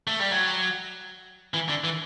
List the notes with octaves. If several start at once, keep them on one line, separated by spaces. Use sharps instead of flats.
A3
G3
F#3
E3
D3
E3